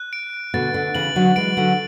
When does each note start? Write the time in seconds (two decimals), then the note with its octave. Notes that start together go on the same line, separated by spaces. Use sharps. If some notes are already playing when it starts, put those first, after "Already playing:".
Already playing: F#6
0.13 D7
0.54 B2 D3 A6
0.74 B2 D3
0.95 C#3 E3 F#7
1.16 D3 F#3
1.36 E3 G#3 D7
1.57 D3 F#3